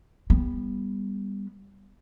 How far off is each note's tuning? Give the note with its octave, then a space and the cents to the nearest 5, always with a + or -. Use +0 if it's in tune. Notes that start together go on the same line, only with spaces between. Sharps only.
G3 +15 B3 -10